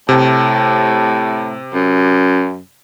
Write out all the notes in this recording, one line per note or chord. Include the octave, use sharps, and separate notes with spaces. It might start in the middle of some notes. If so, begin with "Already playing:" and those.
A2 C3
F#2